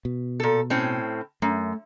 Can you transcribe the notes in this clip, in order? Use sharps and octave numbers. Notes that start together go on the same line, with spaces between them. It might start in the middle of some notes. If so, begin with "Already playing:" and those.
B2
A#2 A4
A2 C4 C#4
F#2 A3